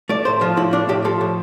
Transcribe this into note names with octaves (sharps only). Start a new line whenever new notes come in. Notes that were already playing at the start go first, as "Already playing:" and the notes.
A3 D5
A2 C5
F3 F4
A2 E4
A3 D4
A2 G4
F3 A4
A2